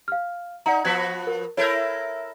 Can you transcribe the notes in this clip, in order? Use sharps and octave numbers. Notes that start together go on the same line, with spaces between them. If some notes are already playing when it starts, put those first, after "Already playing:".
F5 F6
D#4 D5 F#5 A#5
F3 B3 F#4 G#6 B6
A#4
E4 A4 A#4 C#5 G6